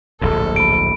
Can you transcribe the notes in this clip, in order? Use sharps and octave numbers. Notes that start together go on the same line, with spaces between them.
D1 A#1 G#2 A4
B5 D7